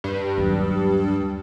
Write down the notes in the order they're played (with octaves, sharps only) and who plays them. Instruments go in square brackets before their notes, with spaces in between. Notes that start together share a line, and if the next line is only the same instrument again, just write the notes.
[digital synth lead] G2
[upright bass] D#2 F#3